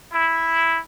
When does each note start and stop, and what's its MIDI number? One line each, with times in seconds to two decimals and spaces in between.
0.12 0.79 64